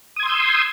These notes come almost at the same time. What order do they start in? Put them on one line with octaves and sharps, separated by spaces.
D#6 G#6 C6 E6 G6